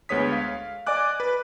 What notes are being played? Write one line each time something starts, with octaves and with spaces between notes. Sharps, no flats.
D2 G#3 B3 C#5 D#6 B6
F5
D5 D#5 G#5 D6 F#6
B4